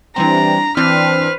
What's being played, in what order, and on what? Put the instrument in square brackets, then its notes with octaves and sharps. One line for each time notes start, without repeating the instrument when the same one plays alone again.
[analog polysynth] E3 G3 C4 [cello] D4 [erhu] A#5
[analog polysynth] E3 C4 D4 [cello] B4 C5 [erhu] F6